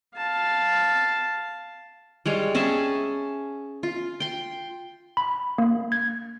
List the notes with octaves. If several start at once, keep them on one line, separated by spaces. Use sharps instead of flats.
F5 A5
G3 G#3 C#5 F5
C#4 G#4 E5 A5
F4
G5 C6
B5
A#3
G#6